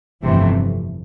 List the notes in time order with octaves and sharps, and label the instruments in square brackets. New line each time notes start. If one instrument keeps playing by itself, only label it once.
[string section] G1 F2 C3 E3 A3